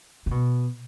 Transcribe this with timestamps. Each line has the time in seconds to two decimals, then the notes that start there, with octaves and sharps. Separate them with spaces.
0.26 C#3
0.31 B2